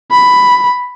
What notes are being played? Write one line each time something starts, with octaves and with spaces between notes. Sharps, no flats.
B5